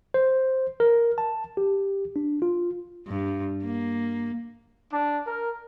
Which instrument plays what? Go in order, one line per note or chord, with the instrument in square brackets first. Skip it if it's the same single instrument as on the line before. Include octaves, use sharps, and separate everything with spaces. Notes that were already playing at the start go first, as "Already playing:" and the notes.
[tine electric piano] C5
A#4
A5
G4
D4
F4
[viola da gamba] G2
A#3
[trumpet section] D4
A#4